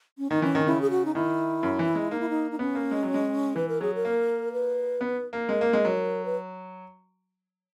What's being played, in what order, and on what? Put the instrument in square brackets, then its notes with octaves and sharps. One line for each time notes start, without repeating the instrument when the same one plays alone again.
[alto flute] C#4
[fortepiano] D#3 [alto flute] D#4
[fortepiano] E3 [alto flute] C#4
[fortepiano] D#3
[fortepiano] C#3 [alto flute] E4
[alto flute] G#4
F#4
D#4
[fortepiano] D#3 [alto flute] E4
[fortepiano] F#2
E3
G#3
[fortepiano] A#3 [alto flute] D#4
[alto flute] E4
D#4
D#4
[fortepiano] B3 [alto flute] C#4
[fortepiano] A#3
G#3
F#3
G#3
[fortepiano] E3 [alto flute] B4
[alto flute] A#4
[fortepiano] F#3 [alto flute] G#4
[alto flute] A#4
[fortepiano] A#3
[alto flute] B4
[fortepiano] B3
A#3
[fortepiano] G#3 [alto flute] A#4
[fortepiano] A#3
G#3
F#3
[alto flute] B4